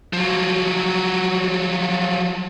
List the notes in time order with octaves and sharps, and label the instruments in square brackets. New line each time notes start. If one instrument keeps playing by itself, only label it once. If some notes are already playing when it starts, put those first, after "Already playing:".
[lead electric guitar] F3 F#3